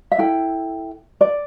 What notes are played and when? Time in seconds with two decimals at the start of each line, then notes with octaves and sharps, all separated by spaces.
0.12 E5
0.18 E4 A4 G5
1.21 D5